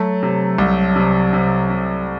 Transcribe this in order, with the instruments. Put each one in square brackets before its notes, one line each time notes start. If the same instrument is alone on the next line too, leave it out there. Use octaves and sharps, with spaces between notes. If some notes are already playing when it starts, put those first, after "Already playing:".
Already playing: [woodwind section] F#3 [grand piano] A3
[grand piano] C3
C2
C3
C3
C3